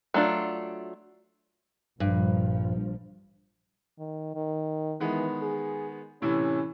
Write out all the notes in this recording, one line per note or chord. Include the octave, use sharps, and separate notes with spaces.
F#3 A3 D4 F4
A#1 G2 F3
D#3
D#3
D#3 E3 G#3 B3
G#4
A2 C3 E3 C#4